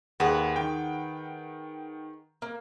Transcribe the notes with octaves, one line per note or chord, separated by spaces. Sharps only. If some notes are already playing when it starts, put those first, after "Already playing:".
D#2 G#4 B4 F#5
D#3 G5
A#3